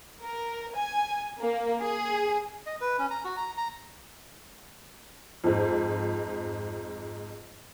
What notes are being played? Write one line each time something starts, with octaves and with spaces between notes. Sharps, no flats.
A#4
G#5
A#3
G#4
D#5
B4
C#4
A#5
F#4
A#5
A#5
F2 G#2